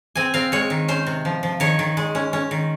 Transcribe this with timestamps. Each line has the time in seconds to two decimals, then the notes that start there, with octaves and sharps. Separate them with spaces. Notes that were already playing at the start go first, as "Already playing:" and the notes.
0.16 C4 G#5
0.34 C4 F5
0.52 G#3 C#5
0.70 D#3
0.88 C#4 C5
1.07 C3
1.25 F3
1.43 F3
1.60 D#3 C#5
1.79 D#3
1.97 G#3
2.15 C#4
2.33 C#4
2.51 D#3